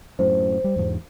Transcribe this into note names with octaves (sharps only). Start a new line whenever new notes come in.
F#2 A2 C5
G3
E2 G#2 G#3